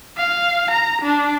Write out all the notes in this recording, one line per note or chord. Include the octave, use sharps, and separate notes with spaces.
F5
A#5
D4